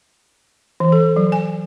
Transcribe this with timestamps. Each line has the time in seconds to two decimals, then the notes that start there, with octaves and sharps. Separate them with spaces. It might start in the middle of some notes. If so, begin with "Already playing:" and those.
0.80 E3
0.92 A4
1.16 F#3
1.32 G#5